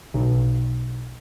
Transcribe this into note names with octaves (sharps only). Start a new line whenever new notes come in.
B1